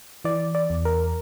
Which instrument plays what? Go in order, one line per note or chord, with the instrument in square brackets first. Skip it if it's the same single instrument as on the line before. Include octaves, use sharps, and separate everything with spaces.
[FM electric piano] E3 D5
D5
E2
A#4